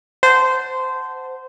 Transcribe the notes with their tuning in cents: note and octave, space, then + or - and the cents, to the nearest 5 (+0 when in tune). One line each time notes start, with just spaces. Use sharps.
C5 -15 F#5 +0 A5 +0